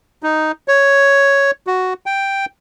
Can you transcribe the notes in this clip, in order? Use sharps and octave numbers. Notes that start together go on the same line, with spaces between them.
D#4
C#5
F#4
G5